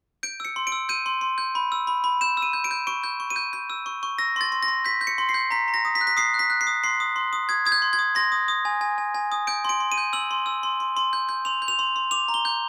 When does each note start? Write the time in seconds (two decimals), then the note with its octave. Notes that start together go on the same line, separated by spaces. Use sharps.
0.23 G6 D7
0.40 E6 C#7
0.56 C6
0.67 D7
0.72 E6
0.89 G6 D#7
1.06 C6
1.21 C6
1.38 G6
1.55 B5
1.72 E6
1.87 B5
2.04 B5
2.21 G6 E7
2.37 E6
2.42 D#7
2.53 G6
2.64 D7
2.71 G6
2.87 C#6 D7
3.04 G6
3.20 C#6
3.30 D#7
3.36 G6
3.53 G6
3.70 E6
3.86 C#6
4.03 C#6
4.18 E6 A#6
4.36 C6 A6
4.52 C6
4.63 A#6
4.68 C6
4.85 G6 B6
5.01 G6
5.07 C#7
5.18 C6
5.29 C7
5.34 G6
5.51 A#5 B6
5.68 A#5
5.74 A#6
5.85 D#6
5.95 B6
6.01 F#6
6.07 B6
6.17 D#6 C7
6.34 F#6
6.39 B6
6.50 F#6
6.61 C7
6.67 D#6
6.84 C6 C7
7.00 D#6
7.16 C6
7.33 D#6
7.49 D#6 G#6
7.66 D#6 G#6
7.72 G6
7.82 C6
7.93 G#6
7.99 D#6
8.15 C6 A#6
8.32 D#6
8.48 D#6
8.65 G#5
8.81 G#5
8.98 G#5
9.14 G#5
9.32 D#6
9.47 G6 D7
9.65 C6 D7
9.80 C6
9.92 D#7
9.98 G6
10.13 E6 F#7
10.31 C6
10.46 E6
10.63 C6
10.80 C6
10.97 C6
11.13 G6
11.29 G6
11.45 C6 F7
11.62 G6
11.68 F7
11.79 C6
11.96 C6
12.11 D6 F7
12.28 A#5
12.34 G7
12.45 G6